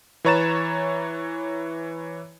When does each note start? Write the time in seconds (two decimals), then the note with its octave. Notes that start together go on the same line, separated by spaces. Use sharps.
0.25 E3 B4 C#5 A#5 A6 E7